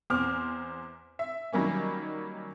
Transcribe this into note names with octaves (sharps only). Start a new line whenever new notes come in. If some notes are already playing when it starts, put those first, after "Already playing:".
E2 C4 D6 F6
E5
D#3 F#3 G3 A#3 C#4